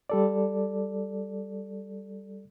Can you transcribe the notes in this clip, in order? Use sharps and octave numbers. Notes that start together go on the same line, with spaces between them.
G3 A4 D5